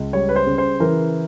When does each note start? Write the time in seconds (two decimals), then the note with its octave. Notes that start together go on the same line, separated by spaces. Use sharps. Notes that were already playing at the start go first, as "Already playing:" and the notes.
Already playing: C#2
0.13 G3 C#5
0.29 B4
0.36 C5
0.47 C#3
0.58 C5
0.80 E3 A#4